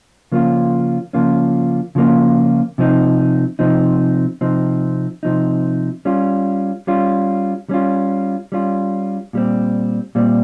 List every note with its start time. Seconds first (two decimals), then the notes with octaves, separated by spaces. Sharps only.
0.32 C#3 F3 A#3 C#4 F4
1.13 C#3 F3 A#3 C#4 F4
1.95 C#3 F3 A#3 C#4 F4
2.78 C3 F3 C4 D#4
3.59 C3 F3 C4 D#4
4.41 C3 F3 C4 D#4
5.23 C3 F3 C4 D#4
6.05 G3 C#4 F4
6.87 G3 C#4 F4
7.69 G3 C#4 F4
8.52 G3 C#4 F4
9.33 A#2 G3 C4
10.15 A#2 G3 C4